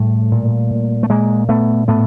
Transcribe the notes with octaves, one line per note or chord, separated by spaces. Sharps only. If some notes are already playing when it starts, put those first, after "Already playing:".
Already playing: A2 G3 A3
A#2
A#2
A3
A#2 G#3 A#3
A#2 A3 B3
A2 A3 B3